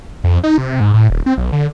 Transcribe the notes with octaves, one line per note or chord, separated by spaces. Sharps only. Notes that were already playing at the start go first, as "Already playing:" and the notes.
F2
D#4
C3
G#2
A2
D#1
C4
B1
D3